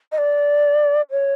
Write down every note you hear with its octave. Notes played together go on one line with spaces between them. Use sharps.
D#5
D5
C#5